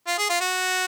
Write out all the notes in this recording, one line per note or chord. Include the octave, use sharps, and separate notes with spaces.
F4
G#4
F4
F#4